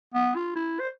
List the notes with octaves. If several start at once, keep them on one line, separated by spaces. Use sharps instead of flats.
B3
F4
E4
C5